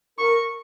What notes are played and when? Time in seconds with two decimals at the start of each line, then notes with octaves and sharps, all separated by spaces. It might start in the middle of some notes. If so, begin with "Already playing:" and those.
0.18 A#4 C#6